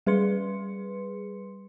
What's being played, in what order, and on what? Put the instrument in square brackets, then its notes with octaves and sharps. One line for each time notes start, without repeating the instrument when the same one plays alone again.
[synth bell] G3 G#4 B4 C6 C#7